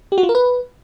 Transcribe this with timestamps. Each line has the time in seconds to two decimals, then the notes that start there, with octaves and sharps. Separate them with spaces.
0.12 G4
0.18 F#4
0.23 F4
0.29 A#4
0.35 B4